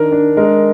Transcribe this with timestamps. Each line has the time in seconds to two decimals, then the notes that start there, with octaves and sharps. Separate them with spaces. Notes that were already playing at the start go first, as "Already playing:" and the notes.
Already playing: D#3 D4 A#4
0.12 D4
0.37 G#3 A#4